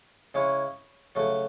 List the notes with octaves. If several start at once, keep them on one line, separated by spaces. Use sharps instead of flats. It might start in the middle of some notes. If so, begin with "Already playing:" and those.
C#3 G#3 C#4 E4
C#3 F#3 A3